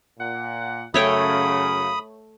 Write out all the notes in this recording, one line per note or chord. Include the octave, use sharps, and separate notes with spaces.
A#2 F#5
F#2 C#3 A3 C#5 G5 B5 D#6